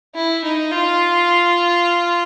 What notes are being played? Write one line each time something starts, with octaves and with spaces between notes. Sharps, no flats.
E4
D#4
F4